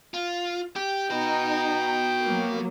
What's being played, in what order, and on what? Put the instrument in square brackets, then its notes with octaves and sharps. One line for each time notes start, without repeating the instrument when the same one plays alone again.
[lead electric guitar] F4
[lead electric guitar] G4 [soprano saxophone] G5
[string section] D#4 [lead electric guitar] F#4 B4
[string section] F#3 A#3